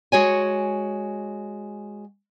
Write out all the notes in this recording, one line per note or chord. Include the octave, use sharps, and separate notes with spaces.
G#3 F#4 C#5 G#5